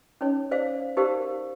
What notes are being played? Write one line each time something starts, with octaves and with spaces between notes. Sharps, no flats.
C#4 D#4 C#5
C5 D5 F5
D#4 G4 A#4 C5 D5 F5